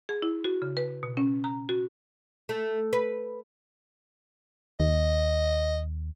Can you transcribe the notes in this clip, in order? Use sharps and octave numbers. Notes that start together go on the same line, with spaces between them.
G#4
E4
F#4
C#3
B4
B2
C#4
A#5
F#4
A3
B4
D#2 D#5